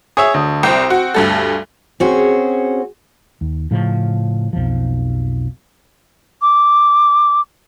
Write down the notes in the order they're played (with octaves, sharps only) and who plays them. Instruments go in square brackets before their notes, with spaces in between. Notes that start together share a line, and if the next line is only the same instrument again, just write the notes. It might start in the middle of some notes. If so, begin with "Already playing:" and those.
[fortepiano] G#4 C#5 E5 [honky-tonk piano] D#6
[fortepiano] D2
[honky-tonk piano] C2 [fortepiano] C4 G5
[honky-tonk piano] F#4
D2 G2 A4
[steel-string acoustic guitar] C4 C#4 F#4 G#4
[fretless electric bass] D#2
A2 C#3 F3
B1 F2 F3
[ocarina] D6